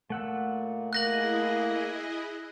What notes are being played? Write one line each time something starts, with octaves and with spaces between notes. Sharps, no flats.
A#2 A3 F#5 E6
A#3 E4 G#4 D#5 F#6 A#6 F#7